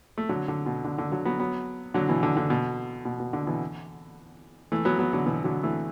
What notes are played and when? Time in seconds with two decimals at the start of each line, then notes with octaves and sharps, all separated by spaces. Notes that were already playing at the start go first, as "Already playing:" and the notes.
0.18 A3
0.29 D3 F#3
0.48 D3
0.66 B2
0.84 D3
0.98 D3
1.12 D3 F#3
1.25 F#3 B3
1.40 F#3 B3
1.94 D3 F#3
2.09 B2 E3
2.23 D3
2.37 D3
2.50 B2
3.05 B2
3.20 B2
3.33 D3
3.47 B2 E3
4.72 E3 A3
4.85 F#3 B3
4.99 F#3 B3
5.13 D3 F#3
5.26 B2 E3
5.44 D3 F#3
5.63 E3 A3